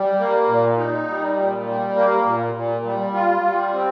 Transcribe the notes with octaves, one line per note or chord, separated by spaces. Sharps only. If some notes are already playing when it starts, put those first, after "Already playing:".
Already playing: G3
A#3
A#2
D#4
G3
A#2
G3
A#3
A#2
A#2
G3
F4
G3
C4